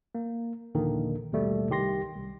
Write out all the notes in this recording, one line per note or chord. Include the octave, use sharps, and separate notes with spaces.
A#3
A#1 D#2 A#2 D3 D#3 A#3
A1 D#2 B2 G3 A3
C2 D#3 G4 C6 A#6
C2